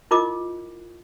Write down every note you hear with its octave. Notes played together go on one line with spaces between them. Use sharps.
E4 F4 A#4 D#5 D6